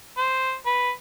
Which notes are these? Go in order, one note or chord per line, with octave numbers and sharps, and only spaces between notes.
C5
B4